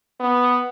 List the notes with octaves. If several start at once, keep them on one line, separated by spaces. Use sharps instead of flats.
B3